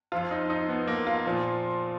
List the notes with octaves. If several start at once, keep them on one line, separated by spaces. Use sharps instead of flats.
F2 F3 F4
D#4
D#4
B3
A#3
F4
A#2 F3